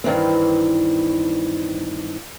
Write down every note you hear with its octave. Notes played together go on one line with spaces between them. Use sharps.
G2 D#3 E3 C4